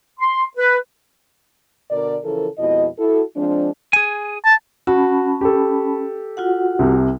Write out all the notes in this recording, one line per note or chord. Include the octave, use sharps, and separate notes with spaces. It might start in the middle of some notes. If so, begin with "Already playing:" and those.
C6
B4
B2 D3 A#4 D5
C#3 E3 F3 A4 A#4
F2 B2 G#3 E4 D#5
E4 F#4 A4
F3 G#3 C4 D4
G#4 G#5
A5
C#4 F#4 A5 B5
G4 A4
F4 F#4 F#5
C2 C3